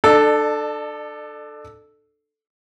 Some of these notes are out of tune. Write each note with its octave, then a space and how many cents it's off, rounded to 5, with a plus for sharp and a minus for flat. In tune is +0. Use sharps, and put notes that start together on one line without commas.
D4 +30 A4 +0 D5 +45